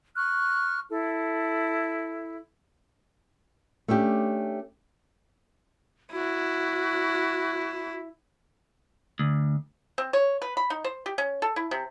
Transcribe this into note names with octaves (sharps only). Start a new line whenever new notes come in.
C#6 F6 F#6
E4 A4
A3 C#4 D4 G4
E4 F#4
D2
C4
C#5
B4
B5
D#4
C5
G4
C#4
A4
E4
C3